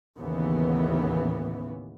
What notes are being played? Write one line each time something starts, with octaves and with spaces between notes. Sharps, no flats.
A1 D#2 C#3 E3 B3